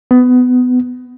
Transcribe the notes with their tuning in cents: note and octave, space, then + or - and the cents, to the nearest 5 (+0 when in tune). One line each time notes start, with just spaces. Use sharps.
B3 +20